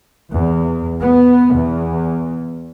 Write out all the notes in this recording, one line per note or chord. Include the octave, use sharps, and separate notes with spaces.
E2
B3
E2